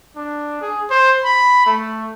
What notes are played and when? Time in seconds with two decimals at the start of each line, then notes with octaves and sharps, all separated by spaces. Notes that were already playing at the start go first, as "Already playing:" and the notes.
0.16 D4
0.61 G#4
0.91 C5
1.24 B5
1.66 A3